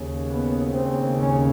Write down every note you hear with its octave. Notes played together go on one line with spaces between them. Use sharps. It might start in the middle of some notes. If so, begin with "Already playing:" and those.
Already playing: D#2 C#3
B3
C4
C#4